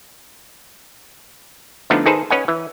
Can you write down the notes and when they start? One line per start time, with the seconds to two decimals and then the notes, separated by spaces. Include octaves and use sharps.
1.90 D3 F3 A3 B3 D4 D#4
2.06 D#3 D#4 G#4 A4 B4 C5
2.30 C#4 B4 C#5 D#5 F#5 G#5
2.48 E3